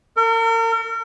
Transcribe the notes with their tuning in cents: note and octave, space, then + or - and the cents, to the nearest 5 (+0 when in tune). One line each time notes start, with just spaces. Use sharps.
A#4 -40